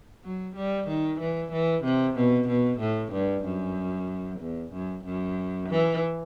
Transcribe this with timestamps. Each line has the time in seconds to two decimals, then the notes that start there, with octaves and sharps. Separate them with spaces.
0.24 F#3
0.55 G3
0.88 D#3
1.20 E3
1.52 E3
1.84 C3
2.16 B2
2.48 B2
2.80 A2
3.12 G2
3.45 F#2
4.40 E2
4.72 F#2
5.05 F#2
5.69 E3